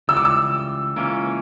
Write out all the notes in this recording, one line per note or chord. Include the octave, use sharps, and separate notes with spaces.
C#2 C#3 E3 G3 E6
D6
E6
C#2 C#3 E3 A#3 C#4